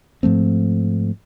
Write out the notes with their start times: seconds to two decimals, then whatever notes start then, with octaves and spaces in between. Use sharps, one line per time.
0.23 G#2 F3 A3 C4